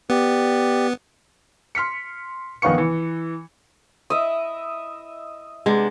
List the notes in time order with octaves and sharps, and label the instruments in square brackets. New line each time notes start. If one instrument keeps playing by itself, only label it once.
[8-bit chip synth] B3 [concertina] G4 D5
[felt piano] C6 F6 B6 C#7
A#1 D#3 B3 F5 C#6 C#7
E3
[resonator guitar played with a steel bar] E4 [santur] D#5 E5
[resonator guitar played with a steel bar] C3 B3 D4 [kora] G#3